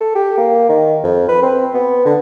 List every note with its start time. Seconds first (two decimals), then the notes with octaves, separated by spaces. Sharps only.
0.01 A4
0.15 G4
0.38 A#3
0.69 D#3
1.04 F2
1.28 B4
1.42 C4
1.74 B3
2.05 D3